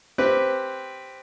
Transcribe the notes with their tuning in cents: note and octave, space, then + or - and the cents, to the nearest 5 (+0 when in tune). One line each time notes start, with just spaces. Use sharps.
C4 +0 G4 +0 B4 +0